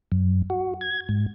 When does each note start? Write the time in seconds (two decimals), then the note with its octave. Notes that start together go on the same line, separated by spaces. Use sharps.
0.12 F#2
0.50 F#4
0.81 G#6
1.09 G#2